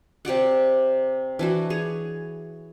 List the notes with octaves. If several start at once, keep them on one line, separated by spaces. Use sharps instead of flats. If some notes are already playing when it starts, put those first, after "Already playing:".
C3 G4 D5 F#5
E3 D4 F#4
G#4 C#5